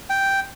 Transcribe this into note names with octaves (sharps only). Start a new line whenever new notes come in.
G5